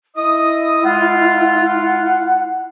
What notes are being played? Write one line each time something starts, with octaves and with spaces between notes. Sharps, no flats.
E4 D#5 D#6
G#3 F4 F#5